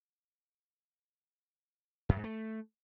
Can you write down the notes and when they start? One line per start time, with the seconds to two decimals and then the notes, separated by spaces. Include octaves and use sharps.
2.09 F#2
2.16 G#2
2.24 A3